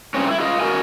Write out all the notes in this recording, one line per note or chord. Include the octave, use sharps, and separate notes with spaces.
G2 C#3 C4 C#4
A3 E4
F4 G#4 D#5 F5
F#4 A#4 D#5 G#5